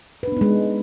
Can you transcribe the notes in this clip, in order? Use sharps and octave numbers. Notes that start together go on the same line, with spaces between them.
G#3 B3 D4 D#4 B4